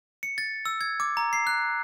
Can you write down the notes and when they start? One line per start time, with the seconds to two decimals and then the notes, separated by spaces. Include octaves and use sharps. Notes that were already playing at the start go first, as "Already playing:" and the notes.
0.23 C#7
0.38 A6
0.66 E6
0.81 G#6
1.00 D6
1.17 A#5
1.33 C7
1.47 F#6